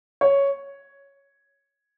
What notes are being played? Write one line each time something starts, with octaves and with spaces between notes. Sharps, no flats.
C#5